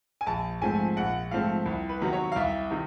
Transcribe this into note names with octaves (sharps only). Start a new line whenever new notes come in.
G#5
A#1 A5
G#2 F3 A3 C4 G#5
A#1 F#5
G#2 F3 A3 C4 F5
C2
B4
C3 D#3 F#3 B3
C#5
F5
C2 E5
C3 D#3